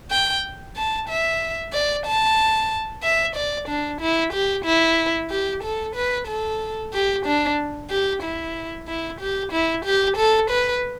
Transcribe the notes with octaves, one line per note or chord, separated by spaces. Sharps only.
G5
A5
E5
D5
A5
E5
D5
D4
E4
G4
E4
G4
A4
B4
A4
G4
D4
G4
E4
E4
G4
E4
G4
A4
B4